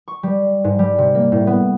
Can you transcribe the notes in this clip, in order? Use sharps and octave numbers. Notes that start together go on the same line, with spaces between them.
C#6
G3
G#2
G3
C3
A#3
A2
B3